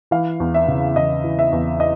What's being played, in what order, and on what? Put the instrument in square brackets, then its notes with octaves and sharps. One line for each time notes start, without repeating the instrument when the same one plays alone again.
[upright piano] E3 F5
E2
E5
C#3
E2 D#5
E3
E5
E2
D#5